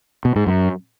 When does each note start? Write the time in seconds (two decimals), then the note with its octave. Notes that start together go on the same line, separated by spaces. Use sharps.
0.25 B2
0.36 G#2
0.46 F#2